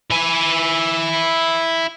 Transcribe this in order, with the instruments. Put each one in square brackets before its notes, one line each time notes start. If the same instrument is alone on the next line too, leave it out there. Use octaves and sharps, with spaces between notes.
[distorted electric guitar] E4 G#5